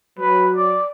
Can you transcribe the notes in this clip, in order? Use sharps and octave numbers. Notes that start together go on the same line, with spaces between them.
F#3 B4
D5